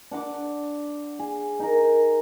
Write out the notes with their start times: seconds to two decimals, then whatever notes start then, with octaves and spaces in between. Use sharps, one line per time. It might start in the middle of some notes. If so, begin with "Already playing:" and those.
0.11 D4 F#5 D6
1.19 G#4
1.60 D#4 A#4